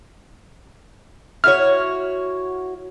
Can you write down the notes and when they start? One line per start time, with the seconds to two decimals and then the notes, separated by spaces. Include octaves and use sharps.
1.44 E4 F#4 C#5 F6